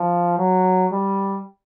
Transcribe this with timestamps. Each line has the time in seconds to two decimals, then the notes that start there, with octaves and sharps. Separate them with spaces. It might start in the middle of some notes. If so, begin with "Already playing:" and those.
Already playing: F3
0.38 F#3
0.93 G3